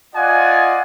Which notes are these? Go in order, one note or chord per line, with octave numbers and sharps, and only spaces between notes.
F4 D5 D#5 F#5 G#5